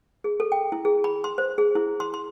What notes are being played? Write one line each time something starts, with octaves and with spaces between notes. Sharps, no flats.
G#4
A4
G5
E4
G#4
B5
C6
C5
G#4
E4
C6
C6